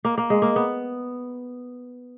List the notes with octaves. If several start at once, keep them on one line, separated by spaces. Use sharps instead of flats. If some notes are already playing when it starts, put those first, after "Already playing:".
A#3
A#3
G#3
A#3
B3